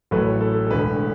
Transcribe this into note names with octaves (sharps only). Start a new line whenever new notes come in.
A1 A2 F#3 A3 B4
A4
A4
E1 D2 D3 B4